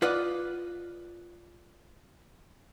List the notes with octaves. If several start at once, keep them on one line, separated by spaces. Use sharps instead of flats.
F4 B4 D5 D#5 F#5